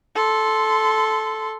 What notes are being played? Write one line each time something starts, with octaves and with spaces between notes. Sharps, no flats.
A4 C6